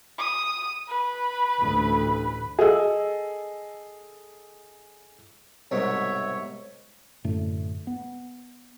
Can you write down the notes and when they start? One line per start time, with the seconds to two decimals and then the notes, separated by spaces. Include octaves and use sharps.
0.19 D#6
0.88 B4
1.61 A1 D2
2.59 G#4 A4 D#5 E6
5.71 C2 G#2 B2 C#5 E5
7.24 F#2 A2 D3 A3
7.87 B3